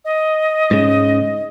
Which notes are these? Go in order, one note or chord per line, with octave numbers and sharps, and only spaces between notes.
D#5
G#2 C#3